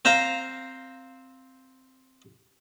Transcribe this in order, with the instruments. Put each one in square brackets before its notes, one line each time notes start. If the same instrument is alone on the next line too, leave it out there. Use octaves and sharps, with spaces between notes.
[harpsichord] C4 C5 F5 A#5